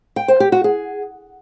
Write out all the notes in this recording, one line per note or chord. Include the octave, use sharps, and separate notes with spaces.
G5
C5
G4
F#4
G#4